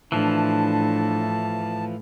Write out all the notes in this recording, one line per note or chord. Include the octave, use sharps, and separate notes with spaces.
A2 E3 F3 D4 A5